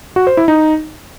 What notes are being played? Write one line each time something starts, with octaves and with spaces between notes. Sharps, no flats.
F#4
C5
E4
D#4